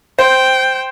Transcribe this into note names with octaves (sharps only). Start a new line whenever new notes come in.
C5 G5